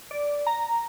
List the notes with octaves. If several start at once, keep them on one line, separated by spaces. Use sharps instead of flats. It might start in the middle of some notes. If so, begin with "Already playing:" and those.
D5
A#5